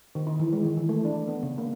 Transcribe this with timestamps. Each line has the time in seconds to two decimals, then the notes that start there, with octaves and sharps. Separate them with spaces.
0.15 D#3
0.27 D#4
0.39 E3
0.53 G#3
0.65 D#3
0.77 E3
0.89 A3
1.05 D4
1.28 B3
1.43 C#3
1.58 A#3